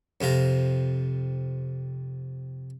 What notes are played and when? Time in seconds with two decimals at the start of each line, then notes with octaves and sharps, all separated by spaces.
0.21 F2 C3 F4 A#5